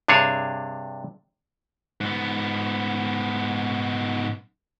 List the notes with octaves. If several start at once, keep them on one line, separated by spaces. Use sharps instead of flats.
G2 C3 D4 G#4 C#5 A5
G#2 B3